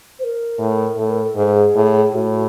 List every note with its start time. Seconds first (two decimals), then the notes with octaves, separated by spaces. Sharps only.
0.19 C5
0.24 A#4
0.58 A2
0.97 A2 A4
1.10 A#4
1.22 A4
1.36 G#2 G#4
1.75 A2
2.14 A2 F#4